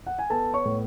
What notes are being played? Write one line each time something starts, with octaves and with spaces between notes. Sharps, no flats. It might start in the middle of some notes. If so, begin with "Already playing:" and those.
F#5
G#5
B3 A4 A5
C#5 C#6
A2